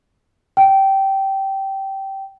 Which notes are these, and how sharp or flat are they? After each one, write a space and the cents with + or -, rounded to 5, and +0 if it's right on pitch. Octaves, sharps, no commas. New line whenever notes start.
G5 -15